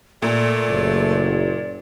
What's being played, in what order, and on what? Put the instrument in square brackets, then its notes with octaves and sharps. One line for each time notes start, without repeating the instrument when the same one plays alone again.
[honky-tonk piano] A#2 [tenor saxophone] A3 [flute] D5
[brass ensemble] F#1